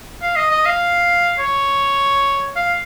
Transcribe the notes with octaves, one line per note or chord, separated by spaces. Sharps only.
F5
D#5
D#5
F5
C#5
F5